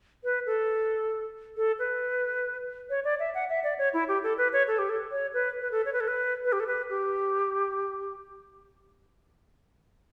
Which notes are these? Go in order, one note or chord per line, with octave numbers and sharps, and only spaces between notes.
B4
A4
A4
B4
C#5
D5
E5
F#5
E5
D5
C#5
E4
G4
A4
B4
C#5
A4
G4
A4
C#5
B4
B4
A4
C#5
B4
A4
B4
B4
G4
A4
B4
G4